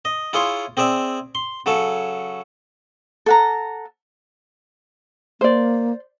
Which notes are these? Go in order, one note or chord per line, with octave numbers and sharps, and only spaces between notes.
D#5
E4 F4 G#4 C#5 C6
C4 G#4 D5 E5
C6
C#3 F#3 A4 C#5 A5
A4 F#5 A#5
A#3 C5 D5